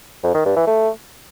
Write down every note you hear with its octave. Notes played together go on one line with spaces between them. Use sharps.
F2
D#3
G2
E3
A3